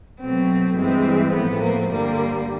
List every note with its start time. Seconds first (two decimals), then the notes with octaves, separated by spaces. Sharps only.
0.20 B2 F#3 A3 C4
0.76 G2 E3 G#3 C4
1.32 A2 F3 A3 B3
1.61 A#3
1.89 G2 D3 G3 A#3